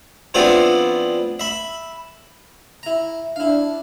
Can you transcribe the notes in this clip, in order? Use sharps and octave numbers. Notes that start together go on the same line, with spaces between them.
F3 B3 C4 D4 E4 F4
E5 B5
E4 A#5
D4 E4 F5